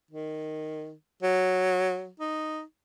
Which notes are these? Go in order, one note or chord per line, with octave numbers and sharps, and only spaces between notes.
D#3
F#3
D#4